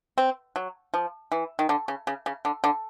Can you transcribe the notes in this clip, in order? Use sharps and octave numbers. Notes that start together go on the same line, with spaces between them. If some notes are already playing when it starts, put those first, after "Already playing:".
C4
F#3
F3
E3
D#3
D3
C#3
C#3
C#3
D3
D3